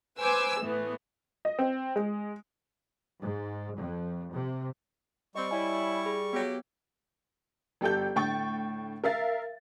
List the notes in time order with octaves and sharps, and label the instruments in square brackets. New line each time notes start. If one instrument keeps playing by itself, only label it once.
[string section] B4 C5 G#5 D6 E6
A2 E3 A3 B3
[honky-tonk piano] D#5
C4
G#3
[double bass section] G#2
F2
C3
[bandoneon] G3 C#6 [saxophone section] C4 [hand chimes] D#5
[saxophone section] E4 [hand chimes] C#5 D5 G#5
[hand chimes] G#4
[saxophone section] F#3 G4 [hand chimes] B3
[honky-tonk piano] G1 G4 A4 G5 G6
A2 D3 G5 C#6 A6
A#4 E5 F5 A6